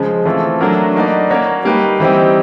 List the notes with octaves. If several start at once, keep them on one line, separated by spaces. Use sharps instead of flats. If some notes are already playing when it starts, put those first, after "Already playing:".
Already playing: C#3 F3 G#3
E3 A3 C4 F4
F#3 A3 D4 F#4 A#4
A#3 D#4 F#4 B4 D5
A#3 C#4 F#4 A#4 C#5
G3 A#3 D#4 G4 B4
E3 G3 C4 D#4 G4